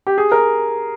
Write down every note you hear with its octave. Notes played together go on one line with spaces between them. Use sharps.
G4
G#4
A#4